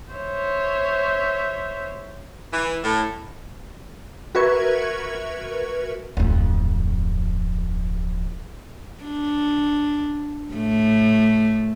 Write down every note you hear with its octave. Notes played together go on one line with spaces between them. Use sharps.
C5 C#5 E5
E3
A2
F#4 A#4 B4 E5 C#6 G#6
D1 F2
D4
A2 A3